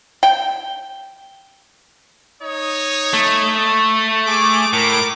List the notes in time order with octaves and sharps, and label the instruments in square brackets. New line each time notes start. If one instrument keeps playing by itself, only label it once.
[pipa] G5
[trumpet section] D#4 C#5 D#6
[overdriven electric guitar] A3
[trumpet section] G#4 D6
[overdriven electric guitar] A2 [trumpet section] A#4 D6